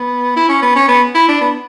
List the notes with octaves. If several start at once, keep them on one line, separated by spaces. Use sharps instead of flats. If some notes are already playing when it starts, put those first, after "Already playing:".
Already playing: B3
E4
C#4
B3
C#4
B3
E4
D4
B3